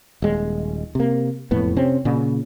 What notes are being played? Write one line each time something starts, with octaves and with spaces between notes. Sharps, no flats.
D#1 G#3
C3 A#3
E1 F2 A2 B3
C3 C4 C#4
A#2 C#3